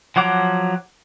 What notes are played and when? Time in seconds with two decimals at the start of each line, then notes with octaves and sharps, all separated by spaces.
0.16 F3 F#3 F#5 D6